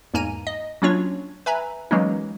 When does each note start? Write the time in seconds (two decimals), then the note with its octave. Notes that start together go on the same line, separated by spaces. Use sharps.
0.14 E2 G#2 A#3 G#5 A#5 D#7
0.47 D#5
0.82 F#3 A#3 C#4 D4 F4 C#5
1.46 B4 E5 G#5 A#5
1.91 E3 F#3 G#3 A#3 C#4 D#4